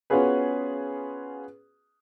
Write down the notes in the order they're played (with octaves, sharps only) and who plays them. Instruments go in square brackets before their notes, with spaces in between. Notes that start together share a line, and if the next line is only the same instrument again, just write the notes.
[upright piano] B3 C#4 F4 F#4 G#4 B4